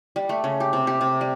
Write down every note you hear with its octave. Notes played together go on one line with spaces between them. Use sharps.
G3
A3
C#3
G4
C3
G4
C3
G3